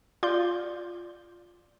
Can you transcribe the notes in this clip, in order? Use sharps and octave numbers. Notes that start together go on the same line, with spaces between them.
F4 D5 G6